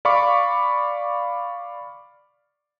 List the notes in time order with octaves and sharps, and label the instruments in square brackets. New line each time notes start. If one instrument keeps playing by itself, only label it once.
[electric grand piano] D5 F5 B5 C#6 D6